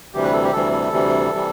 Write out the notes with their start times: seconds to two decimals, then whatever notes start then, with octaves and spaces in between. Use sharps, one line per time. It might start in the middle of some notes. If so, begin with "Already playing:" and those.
0.13 D2 C3 E3 G3 G4
0.23 B4
0.33 A4
0.43 G4
0.53 D2 C3 E3 G3 A4
0.72 A4
0.92 D2 C3 E3 G3
1.32 C3 E3 G3